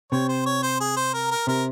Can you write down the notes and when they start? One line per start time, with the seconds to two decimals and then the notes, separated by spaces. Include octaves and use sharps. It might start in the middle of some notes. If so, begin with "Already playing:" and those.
0.12 C3 C#5
0.29 C5
0.46 C#5
0.63 C5
0.80 G#4
0.96 C5
1.14 A#4
1.31 A#4
1.47 C3 A#4